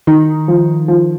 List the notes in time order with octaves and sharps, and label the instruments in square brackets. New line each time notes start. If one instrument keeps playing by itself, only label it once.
[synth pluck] D#3 [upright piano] D#4
[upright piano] F3
F3